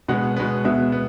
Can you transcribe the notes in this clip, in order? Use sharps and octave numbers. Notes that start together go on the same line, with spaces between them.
B2 G#3 B3 F#5
B2 G#3 B3
B2 G#3 B3 E5
B3